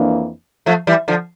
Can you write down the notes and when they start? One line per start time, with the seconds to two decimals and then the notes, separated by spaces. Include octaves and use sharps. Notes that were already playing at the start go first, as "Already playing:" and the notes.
Already playing: F2 E3 A#3 D4
0.66 F3 A3
0.87 E3 G3
1.08 D3 F3